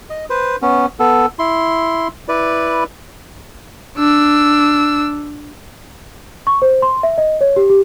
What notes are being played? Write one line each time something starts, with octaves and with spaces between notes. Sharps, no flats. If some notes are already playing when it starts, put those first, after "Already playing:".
D#5
B4 C5
B3 C#4
B3 A4
E4 C6
E4 B4 D5
D4 E6
C#6
C5
C6
E5
D#5
C#5
G4
G4